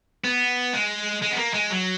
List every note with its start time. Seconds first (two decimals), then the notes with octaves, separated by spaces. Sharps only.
0.24 B3
0.73 G#3
1.22 G#3
1.32 B3
1.38 A#3
1.54 G#3
1.71 F#3